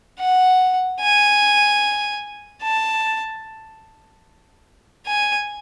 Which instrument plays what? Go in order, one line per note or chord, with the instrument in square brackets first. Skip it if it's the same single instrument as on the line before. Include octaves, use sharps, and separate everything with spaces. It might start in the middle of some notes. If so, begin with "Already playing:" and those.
[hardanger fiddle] F#5
G#5
A5
G#5